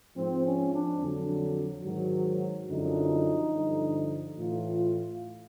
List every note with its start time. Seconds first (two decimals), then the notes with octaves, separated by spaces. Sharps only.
0.17 G#2 F3 C4
0.45 C#4
0.72 D4
1.01 F2 D3 F#3
1.85 G#2 D#3 F#3
2.70 F#2 D3 F3 D#4
3.54 G2 D3 F3
4.37 A2 E3 F4